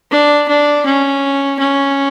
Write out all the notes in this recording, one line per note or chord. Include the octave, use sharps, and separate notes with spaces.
D4
D4
C#4
C#4